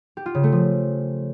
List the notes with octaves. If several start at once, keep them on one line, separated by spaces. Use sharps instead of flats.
G4
F4
C#3
A3
F3